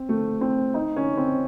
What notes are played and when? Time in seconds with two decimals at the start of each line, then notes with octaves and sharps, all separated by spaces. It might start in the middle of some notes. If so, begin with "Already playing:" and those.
Already playing: C4
0.09 A3
0.41 C4
0.74 D#4
0.96 C#4
1.17 C4